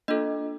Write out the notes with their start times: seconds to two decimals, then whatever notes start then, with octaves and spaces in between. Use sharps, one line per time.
0.08 A#3 D4 F4 A4 D#5